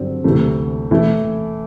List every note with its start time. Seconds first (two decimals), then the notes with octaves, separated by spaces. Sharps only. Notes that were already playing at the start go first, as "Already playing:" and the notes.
Already playing: G2 D3 F#3 C4
0.24 D2 C3 E3 A3
0.91 E3 A3 E4